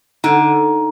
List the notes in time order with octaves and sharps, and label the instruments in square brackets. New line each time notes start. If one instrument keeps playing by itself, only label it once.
[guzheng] D3 [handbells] D#4